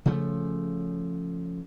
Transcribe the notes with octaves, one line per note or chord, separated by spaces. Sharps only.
C#3 F3 A3